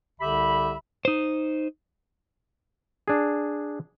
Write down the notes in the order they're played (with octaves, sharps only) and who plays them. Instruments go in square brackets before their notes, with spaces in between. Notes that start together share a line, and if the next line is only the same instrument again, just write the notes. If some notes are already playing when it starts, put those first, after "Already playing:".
[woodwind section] C2 D3 G4 E5 B5
[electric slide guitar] D#4 C5
[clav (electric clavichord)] D4 G#4